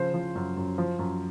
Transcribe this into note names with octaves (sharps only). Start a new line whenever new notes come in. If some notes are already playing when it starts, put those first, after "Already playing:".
Already playing: C#3 F3 C5
F3
F#2
F#2
F3
F#2